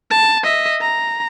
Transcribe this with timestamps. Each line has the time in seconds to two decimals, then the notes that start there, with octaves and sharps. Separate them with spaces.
0.11 A5
0.44 D#5 E5
0.81 A#5